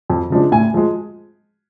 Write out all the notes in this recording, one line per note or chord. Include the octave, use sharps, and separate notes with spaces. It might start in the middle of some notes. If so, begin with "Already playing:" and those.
F2
C#3 F3 G#3 D4
A2 G#5
F3 G#3